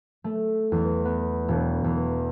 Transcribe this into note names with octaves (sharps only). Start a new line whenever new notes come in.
A3
E2
B3
E1
E2